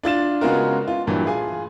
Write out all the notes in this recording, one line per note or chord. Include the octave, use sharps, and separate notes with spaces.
D4 F4 A6 E7
C#3 G#3 B3 F4 F#4 A#4
F4
G2 A#2 E3 F#3
F4 G#4 G#5